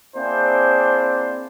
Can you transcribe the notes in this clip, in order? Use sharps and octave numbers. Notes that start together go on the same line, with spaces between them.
A#3 C4 D4 E4 G#4 C5